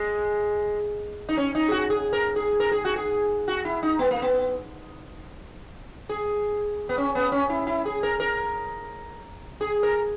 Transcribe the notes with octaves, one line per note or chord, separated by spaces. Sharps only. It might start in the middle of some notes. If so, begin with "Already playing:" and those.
Already playing: G#3
D#4
C#4
D#4
G#4
F#4
G#4
A#4
G#4
A#4
G#4
F#4
G#4
F#4
E4
D#4
B3
A#3
B3
G#4
B3
C#4
B3
C#4
E4
E4
G#4
A#4
A#4
G#4
A#4